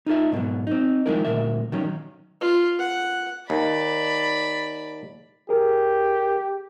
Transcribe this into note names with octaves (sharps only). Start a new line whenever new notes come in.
D#4 F4 A4 E5
G#2 B2 F3 F#3
C4 D#4
D#3 F3 G#3 D#4 E4 A#4
D2 G2 A#2 A#4 E5
D#3 F#3 C#4
F4
F#5
D#2 D5 B5
G4 G#4 A#4